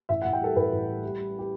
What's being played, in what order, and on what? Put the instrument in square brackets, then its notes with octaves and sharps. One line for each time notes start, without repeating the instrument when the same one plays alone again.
[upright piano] A1 E5
A2 F#5
G5
G3 A4
A1 B4
A1
G3
G3
G3
G4